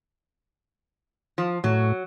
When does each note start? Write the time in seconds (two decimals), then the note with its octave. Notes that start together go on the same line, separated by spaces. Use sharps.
1.38 F3
1.64 A2 F#3